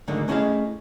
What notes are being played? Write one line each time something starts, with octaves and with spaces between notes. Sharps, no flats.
G#2 D3 D#3 F#3 A3 A#3
A3 C#4 E4 G#4 D#5 F5